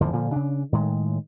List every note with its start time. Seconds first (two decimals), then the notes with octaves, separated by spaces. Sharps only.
0.01 G#1 E2 D3 F3
0.13 A#2 D3 F3
0.32 C#3 D4
0.72 A2 D#3 G#3